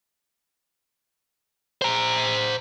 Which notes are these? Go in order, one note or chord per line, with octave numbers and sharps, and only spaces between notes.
C5 A#5